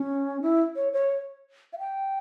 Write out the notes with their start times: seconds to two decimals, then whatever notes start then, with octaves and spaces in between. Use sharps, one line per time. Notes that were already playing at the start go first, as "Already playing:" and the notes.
Already playing: C#4
0.42 E4
0.76 C#5
0.93 C#5
1.73 F5
1.79 G5